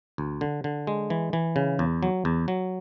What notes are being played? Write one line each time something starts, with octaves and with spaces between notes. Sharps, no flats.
D2
D3
D3
G#3
E3
E3
C#3
E2
F#3
E2
F#3